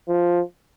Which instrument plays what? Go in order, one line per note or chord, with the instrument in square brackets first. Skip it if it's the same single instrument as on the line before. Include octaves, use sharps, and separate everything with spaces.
[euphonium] F3